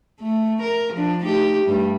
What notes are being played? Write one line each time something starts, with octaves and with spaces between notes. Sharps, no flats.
A3
A#4
F3 D4
A3 D#4 G4
G2 G3 A3